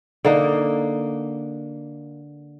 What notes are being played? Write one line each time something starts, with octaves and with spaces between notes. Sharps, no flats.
D3 A#3 D#4